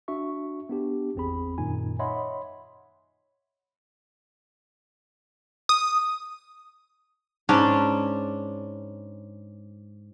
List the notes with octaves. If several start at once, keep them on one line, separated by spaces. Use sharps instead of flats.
D4 F#4 E5 C#6
B3 D4 G4
G#1 E2 C4 G#4 B5
F#2 A#2 D#3 D#4 G#5
C#5 D#5 E5 F#5 B5 C6
D#6
G#2 C#4 D4 D5